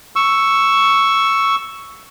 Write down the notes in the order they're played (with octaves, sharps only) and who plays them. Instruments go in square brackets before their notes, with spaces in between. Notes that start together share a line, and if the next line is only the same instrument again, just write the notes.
[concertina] C#6 E6